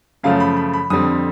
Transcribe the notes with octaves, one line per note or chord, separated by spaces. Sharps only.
F#2 C#3 F3 A3 F5
B5
B5
B5
F2 D3 G3 C4 D#6